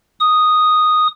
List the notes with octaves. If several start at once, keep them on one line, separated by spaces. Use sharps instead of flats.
D#6